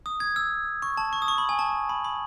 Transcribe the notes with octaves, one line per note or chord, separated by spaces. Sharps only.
D#6
G#6
E6
C#6
A5
C#6
D#6
C#6
B5
G#5
A5
B5
B5